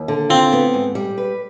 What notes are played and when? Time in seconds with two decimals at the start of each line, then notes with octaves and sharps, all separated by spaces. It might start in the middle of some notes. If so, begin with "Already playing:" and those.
Already playing: D#2
0.08 D3
0.29 C4 F4
0.53 B3
0.74 G#2
0.95 G3
1.18 B4